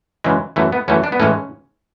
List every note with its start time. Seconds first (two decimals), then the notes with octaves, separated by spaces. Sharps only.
0.24 F#2 C#3 E3 G#3
0.56 F#2 E3 A3
0.72 B3
0.88 F#2 E3 A3 C#4
1.04 D4
1.12 B3
1.19 A2 E3 G#3 C#4